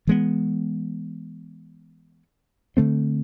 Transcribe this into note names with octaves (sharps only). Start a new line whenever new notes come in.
E3 G#3 B3
D3 A3 C4